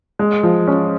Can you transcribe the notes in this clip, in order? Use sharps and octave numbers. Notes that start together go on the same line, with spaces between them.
G#3
F3
C#4